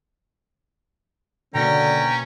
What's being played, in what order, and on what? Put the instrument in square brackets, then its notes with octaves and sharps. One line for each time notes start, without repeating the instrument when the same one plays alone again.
[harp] B2 A#3 [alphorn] D3 [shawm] C#4 [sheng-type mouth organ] G5 A#5